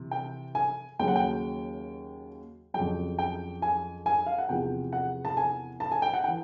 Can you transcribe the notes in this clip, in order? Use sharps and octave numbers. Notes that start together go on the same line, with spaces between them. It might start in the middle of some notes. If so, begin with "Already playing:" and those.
Already playing: C3 E3
G5
G#5
D#2 C#3 F#3 G5
F#5
G5
F2 C#3 F#3 G5
G5
G#5
G#5
F5
F#5
E2 C3 F3 G5
F#5
A5
G#5
A5
G#5
G5
F#5
E3 G5